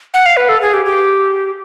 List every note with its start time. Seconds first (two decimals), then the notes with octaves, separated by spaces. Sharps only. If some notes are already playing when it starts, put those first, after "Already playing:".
0.14 F#5
0.26 F5
0.37 B4
0.49 A4
0.62 G#4
0.74 G4
0.86 G4